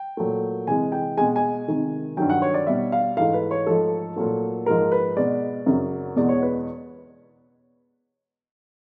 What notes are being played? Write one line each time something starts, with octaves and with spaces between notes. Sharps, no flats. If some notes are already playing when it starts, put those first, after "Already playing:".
Already playing: G5
A#2 F#3 A3
C3 E3 G#3 G#5
G5
B2 G#3 G#5
G#5
C3 D#3 G#3
G2 D#3 F#3 G5
F#5
C#5
D5
B2 G3 E5
F5
G#2 E3 A3 F5
B4
C#5
G#2 F3 A3 A4
A#2 F#3 A3
G#2 F3 G#3 A#4
B4
B2 G#3 D5
F#2 C#3 F#3
E2 B2 G#3 D5
C#5
B4